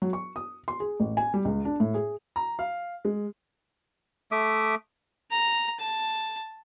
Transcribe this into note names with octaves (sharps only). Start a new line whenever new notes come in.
F#3
C#6
D#6
C6
G#4
A1
G#5
G3
C#2
D4
A2
G#4
A#5
F5
G#3
A3 E5 D6 D#6
A#5
A5